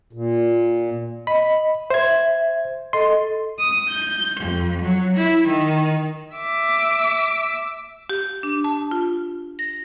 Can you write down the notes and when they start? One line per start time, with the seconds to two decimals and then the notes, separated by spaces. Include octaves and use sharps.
0.13 A#2
1.27 D#5 B5
1.90 C5 E5 G#6
2.93 A4 D#5 C6
3.58 D#6
3.89 G6
4.40 F2
4.81 F#3
5.16 E4
5.47 D#3
6.36 E5 D6
8.10 G4
8.43 D4
8.64 A5
8.91 F4
9.59 A#6